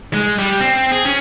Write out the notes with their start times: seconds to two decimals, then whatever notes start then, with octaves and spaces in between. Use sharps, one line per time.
0.13 G#3
0.39 G3
0.60 C4
0.92 G#4
1.05 C#4